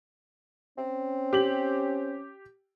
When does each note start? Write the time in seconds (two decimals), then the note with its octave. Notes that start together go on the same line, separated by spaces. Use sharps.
0.78 C4 C#4
1.33 G4 F#7